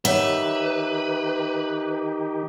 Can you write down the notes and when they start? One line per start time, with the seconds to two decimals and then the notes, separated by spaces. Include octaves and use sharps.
0.05 D#3 D#4 G4 B4 C#5 E5 F#5